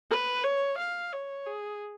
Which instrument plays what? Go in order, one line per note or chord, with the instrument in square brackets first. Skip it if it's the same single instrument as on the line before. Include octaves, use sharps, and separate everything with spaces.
[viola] B4
C#5
F5
C#5
G#4